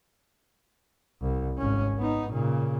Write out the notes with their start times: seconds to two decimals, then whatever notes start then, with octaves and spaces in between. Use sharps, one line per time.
1.21 C2
1.59 G#1 C#4
1.98 B3 D#4
2.31 A#2 C#3